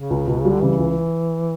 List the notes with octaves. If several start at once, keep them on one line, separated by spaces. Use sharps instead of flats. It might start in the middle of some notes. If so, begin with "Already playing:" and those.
Already playing: C#3
C#2
C#2 B2
C#3 G3
D3
C#3 E3
C#2